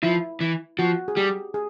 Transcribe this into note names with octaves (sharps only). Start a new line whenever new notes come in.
F3 E4
E3
F3 F#4
G#4
G3 G4
G#4